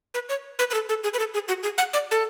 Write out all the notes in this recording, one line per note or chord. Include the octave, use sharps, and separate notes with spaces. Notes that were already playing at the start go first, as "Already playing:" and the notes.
B4
C#5
B4
B4
A4
A4
G#4
B4
A4
G#4
F#4
G#4
F#5
D5
A4